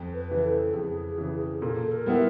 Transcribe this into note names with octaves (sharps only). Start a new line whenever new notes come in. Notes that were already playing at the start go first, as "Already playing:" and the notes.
Already playing: F2
B4
C#3 E3
A4
F2 G#4
C#3 E3
A#2 A4
A#4
G3 B3 E4